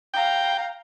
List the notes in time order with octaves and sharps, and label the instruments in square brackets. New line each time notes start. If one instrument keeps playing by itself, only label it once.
[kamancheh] F5 A#5 [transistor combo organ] G5